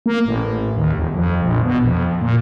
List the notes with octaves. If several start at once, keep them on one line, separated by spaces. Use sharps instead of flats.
A#3
A1
D#2
E1
F2
A#1
B2
F2
A#2